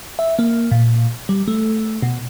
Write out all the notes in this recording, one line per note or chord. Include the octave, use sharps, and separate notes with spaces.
E5
A#3
A#2
G3
A3
B2